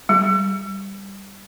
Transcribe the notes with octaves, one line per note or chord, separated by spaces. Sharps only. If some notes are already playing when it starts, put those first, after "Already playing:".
G3